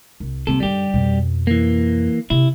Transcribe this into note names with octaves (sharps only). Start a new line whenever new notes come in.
C2
C3 G3 A#3 A4
F#2 D3 G3 G4
F2 B2
E3 A#3
C3 C4 E4